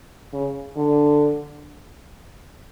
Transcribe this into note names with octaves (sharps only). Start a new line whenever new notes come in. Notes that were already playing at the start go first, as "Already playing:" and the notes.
C#3
D3